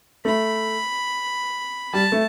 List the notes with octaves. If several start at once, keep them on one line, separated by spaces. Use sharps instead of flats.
A3 B5
G3 A5
A3